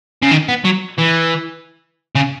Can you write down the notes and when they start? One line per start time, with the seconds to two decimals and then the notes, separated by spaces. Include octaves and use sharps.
0.22 C#3
0.31 D#3
0.49 B3
0.65 F#3
0.99 E3
2.15 C#3